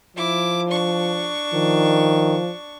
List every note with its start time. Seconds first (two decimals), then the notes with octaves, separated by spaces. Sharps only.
0.17 F3 E4 D6
0.69 D4 C#6
1.54 D#3 F3